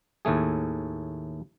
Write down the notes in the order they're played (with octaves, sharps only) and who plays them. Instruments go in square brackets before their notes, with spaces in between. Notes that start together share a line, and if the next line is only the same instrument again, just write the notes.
[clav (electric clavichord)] D#2 A2 A3 G#4